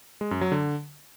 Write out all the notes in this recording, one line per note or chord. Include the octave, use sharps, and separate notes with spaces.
G#3
F#2
F#3
D3